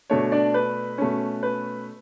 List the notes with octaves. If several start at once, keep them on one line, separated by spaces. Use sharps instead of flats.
B2 A3 D4 C#5
D4 D5
B4
B2 A3 C#4
B4